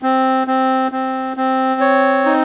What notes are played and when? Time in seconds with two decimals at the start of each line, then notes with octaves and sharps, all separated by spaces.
0.02 C4
0.47 C4
0.92 C4
1.37 C4
1.81 C#5
2.25 D#4